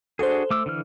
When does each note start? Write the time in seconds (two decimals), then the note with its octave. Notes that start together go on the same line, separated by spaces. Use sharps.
0.19 D4 F#4 G#4 A4 C5
0.51 A3 D6 E6
0.66 D3 E3 F6